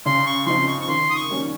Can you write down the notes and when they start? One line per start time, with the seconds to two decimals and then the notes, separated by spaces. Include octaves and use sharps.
0.06 C#3 C6
0.26 C#6
0.46 F3 C4 D#4 C6
0.67 C#6
0.81 C#6
0.88 D#3 C6
1.10 D#6
1.16 C#6
1.30 G3 A#3 C#4